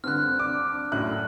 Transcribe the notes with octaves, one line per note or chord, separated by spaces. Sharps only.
G2 D3 C4 F6 F#6
D4 D6
F#2 A2 F#6